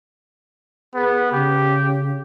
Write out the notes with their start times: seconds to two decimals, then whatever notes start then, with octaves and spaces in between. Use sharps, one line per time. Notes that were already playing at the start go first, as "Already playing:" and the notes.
0.94 B3 G#4
1.32 C#3 G4